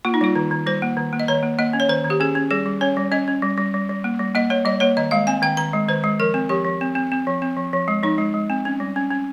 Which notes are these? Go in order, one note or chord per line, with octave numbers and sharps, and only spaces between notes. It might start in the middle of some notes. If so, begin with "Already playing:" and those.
A#3 F4
D#4
G3 F4
D#3
D#3
G3 C5
A#3
D#3
A#3
D#5
D#3 C#5
A#3
A#3 D#5
C#4
C#5
D#3 C5
D#3
G4
C#4 G#4
C#4
G3 G#4
G3
C#4 C#5
G3
C#4 D#5
C#4
G3
G3
G3
G3
A#3
G3
A#3 D#5
A#3 C#5
G3 D#5
A#3 C#5
D#3 D#5
G#3 F5
C4 G#5
D#3 G5
D#3 A#5
G#3
D#3 C5
G#3
F3 A#4
C4
F3 G4
F3
C4
C4
C4
F3
C4
F3
F3
G#3
F3 D#4
G#3
G#3
C4
C#4
G3
C#4
C#4